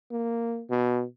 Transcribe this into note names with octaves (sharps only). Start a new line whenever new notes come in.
A#3
B2